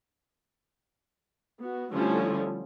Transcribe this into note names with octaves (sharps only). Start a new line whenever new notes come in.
B3 F#4
D3 F3 G3 A3 C#4 E4